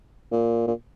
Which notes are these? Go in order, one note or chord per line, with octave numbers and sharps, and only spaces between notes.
A#2
A#2